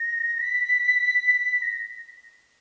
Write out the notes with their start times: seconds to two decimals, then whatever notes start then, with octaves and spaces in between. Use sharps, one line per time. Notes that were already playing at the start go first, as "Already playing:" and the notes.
Already playing: A#6
0.40 B6
1.62 A#6